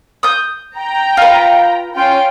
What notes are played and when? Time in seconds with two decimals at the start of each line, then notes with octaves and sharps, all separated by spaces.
0.23 D#6 G6
0.77 G5 A#5
1.17 F4 B4
1.96 C#4 F4 G5